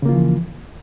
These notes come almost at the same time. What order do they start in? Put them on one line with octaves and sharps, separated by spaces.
C#3 A#3 F4 F3 E3